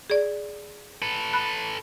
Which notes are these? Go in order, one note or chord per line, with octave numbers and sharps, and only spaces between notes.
G#4 D5
A4 B4
B5 F#6